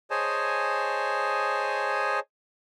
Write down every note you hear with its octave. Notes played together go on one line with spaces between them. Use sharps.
G#4 C5 C#5 D#5 G#5 A5